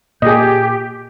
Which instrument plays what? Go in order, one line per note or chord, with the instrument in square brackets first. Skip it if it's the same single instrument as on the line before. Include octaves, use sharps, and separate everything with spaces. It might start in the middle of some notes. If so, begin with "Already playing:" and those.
[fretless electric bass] A#2 [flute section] G4 G6 [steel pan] G#4 D#5